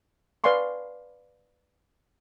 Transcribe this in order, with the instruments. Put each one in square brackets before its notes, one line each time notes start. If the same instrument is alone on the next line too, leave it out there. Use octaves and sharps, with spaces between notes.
[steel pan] B4 D5 F5 G#5 C6 C#6